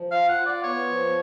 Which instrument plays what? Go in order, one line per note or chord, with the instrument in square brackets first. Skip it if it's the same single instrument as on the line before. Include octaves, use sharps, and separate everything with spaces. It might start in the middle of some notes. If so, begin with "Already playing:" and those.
Already playing: [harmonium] F3
[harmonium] F4 [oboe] F5
[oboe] F#5
[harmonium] F4
[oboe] D5
[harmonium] B3 [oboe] C#5
[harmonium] F3